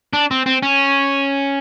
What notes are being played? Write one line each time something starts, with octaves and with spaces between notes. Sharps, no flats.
D4
C4
C4
C#4